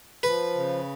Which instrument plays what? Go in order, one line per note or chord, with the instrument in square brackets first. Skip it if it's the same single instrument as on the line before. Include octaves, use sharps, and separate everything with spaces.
[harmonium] F3 [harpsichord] B4
[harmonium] C#3